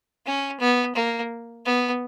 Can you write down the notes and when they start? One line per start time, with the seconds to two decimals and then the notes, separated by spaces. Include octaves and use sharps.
0.26 C#4
0.60 B3
0.95 A#3
1.65 B3